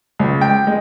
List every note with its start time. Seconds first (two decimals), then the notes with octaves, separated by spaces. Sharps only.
0.19 C#2
0.41 G5
0.67 G#3